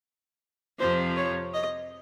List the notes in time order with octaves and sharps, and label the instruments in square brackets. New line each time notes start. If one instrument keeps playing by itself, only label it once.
[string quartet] F2 C3 F3 [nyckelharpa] C5
[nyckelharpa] C#5
D#5